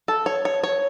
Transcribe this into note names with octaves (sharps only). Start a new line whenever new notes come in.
A4
C#5
C#5
C#5